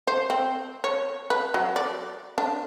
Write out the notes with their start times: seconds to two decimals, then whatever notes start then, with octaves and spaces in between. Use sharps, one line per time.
0.07 C5
0.30 C4
0.84 C#5
1.30 B4
1.54 F#3
1.76 D5
2.38 D4